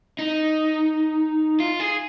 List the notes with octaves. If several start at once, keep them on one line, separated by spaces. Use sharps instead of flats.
D#4
F4
G#4